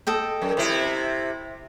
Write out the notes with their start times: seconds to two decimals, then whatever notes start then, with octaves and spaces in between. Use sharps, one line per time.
0.07 A4 D#5 G5
0.41 F#2
0.57 C3 E4